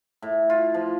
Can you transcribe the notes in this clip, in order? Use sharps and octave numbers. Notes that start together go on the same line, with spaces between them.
A2
F4
F3